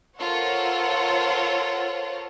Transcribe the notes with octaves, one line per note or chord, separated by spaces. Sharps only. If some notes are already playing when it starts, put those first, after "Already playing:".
F4 A4 A#4 C5 C#5 F#5